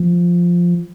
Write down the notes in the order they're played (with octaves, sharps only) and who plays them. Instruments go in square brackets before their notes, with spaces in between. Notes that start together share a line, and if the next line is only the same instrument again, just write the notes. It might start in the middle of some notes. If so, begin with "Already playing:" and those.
Already playing: [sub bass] F3